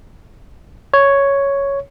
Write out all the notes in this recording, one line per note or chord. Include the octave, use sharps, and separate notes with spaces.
C#5